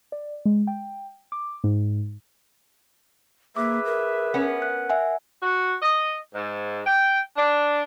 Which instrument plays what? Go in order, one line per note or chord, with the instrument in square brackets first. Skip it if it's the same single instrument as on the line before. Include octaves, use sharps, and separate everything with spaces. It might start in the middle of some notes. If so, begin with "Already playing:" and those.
[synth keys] D5
G#3
G5
D6
G#2
[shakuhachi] A#3 [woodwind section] G#4 B4 E5 [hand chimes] D6
[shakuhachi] A#4
[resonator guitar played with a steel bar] B3 C#4
[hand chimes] F#6
E5 F#5 G#5
[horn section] F#4
D#5
G#2
G5
D4